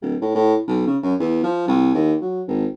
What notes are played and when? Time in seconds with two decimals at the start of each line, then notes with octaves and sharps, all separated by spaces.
0.02 D1
0.22 A2
0.35 A2
0.67 B1
0.87 C#3
1.03 F#2
1.20 E2
1.43 F3
1.68 C2
1.94 D#2
2.22 F#3
2.48 G#1